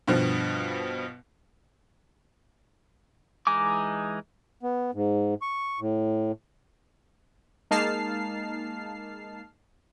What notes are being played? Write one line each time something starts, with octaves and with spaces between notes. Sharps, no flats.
G2 B2 F3
E3 G#3 D#4 G#5 D6
B3
G#2
C#6
A2
G#3 A#3 D#4 A5 F6 C7